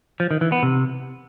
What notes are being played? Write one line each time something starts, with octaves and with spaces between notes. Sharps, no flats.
F3
D#3
E3
B3
C3